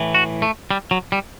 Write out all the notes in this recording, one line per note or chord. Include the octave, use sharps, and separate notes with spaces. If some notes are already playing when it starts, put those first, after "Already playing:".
Already playing: A2 E3
F#4
A3
G3
F#3
G3